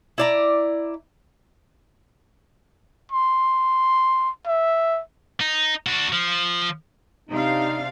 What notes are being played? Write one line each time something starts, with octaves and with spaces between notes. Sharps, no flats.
E4 D5 A#5
C6
E5
D#4
D4 F#4
F3
C3 D4 D#4 F5